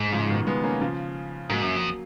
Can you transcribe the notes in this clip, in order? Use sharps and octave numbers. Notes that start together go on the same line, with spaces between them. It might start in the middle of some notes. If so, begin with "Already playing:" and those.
Already playing: G#2
C#3 F3
B2 D#3
G#3 B3
A#3 C#4
C#3 F3
G#2 F#3 A#3
F#2
F2